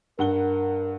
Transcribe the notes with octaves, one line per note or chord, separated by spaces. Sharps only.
G2 A#4 F#5 G7